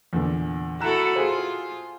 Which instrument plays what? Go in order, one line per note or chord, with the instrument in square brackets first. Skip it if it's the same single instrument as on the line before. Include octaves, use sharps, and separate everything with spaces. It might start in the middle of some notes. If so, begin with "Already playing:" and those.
[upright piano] E2 A#2 D3
[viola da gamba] E4 F#4 A4 [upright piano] A#5 F#6 E7
[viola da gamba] F4 [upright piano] G#4 C5